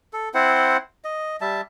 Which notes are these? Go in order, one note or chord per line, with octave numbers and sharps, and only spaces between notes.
A4
C4 E4 C5 F#5
D#5
G3 E5 A5